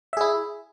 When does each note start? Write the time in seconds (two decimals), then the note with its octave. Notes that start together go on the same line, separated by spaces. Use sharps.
0.13 E5
0.17 G#4
0.21 E4